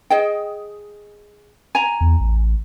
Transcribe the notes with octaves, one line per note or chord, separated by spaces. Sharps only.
G#4 D#5 G5
G#5 A#5
E2
A1